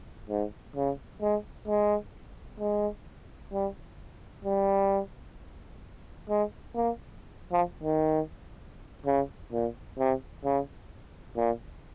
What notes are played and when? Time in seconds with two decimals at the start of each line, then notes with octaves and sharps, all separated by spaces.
0.30 G#2
0.76 C#3
1.22 G#3
1.68 G#3
2.60 G#3
3.53 G3
4.45 G3
6.30 G#3
6.76 A#3
7.53 F3
7.83 D#3
9.06 C#3
9.53 A#2
9.99 C3
10.45 C#3
11.37 A#2